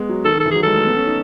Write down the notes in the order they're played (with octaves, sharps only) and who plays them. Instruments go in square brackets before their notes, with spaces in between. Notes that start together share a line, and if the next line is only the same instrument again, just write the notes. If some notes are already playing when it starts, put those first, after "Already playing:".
Already playing: [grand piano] G#3 B3
F#3
[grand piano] D#3 [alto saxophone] A4
[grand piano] D#3
[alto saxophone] A4
[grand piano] E3
[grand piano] F#3 [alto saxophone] G#4
[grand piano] G#3 [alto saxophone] A4
[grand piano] A3
B3
C#4
D#4